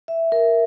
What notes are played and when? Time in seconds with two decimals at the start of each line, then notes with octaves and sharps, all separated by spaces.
0.08 E5
0.32 A#4